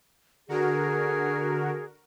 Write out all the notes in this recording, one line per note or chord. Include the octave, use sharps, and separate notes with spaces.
D3 F#4 G#4 A#4